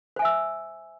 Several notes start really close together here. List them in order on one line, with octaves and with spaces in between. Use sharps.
C5 G#5 E5 E6